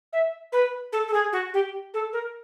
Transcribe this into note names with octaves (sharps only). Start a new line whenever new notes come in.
E5
B4
A4
A4
G#4
F#4
G4
A4
A#4